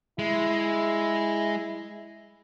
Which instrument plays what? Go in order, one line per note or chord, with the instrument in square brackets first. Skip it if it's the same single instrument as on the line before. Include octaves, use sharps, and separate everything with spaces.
[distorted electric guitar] G#3 [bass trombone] E4